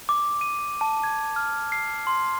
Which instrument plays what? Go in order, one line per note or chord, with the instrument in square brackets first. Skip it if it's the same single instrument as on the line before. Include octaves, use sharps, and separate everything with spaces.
[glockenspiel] D6
D#7
A5
G#6
F6
C7
C6